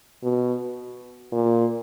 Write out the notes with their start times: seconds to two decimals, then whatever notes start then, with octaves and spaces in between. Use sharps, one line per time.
0.23 B2
1.32 A#2